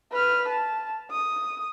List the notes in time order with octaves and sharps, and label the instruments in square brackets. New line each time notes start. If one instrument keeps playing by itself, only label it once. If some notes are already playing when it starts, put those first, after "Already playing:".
[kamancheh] B4 F6
A5
D#6